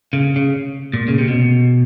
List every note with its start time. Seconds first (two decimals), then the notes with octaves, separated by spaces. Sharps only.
0.13 C#3
0.36 C#3
0.93 A#2
1.08 C#3
1.18 C3
1.28 B2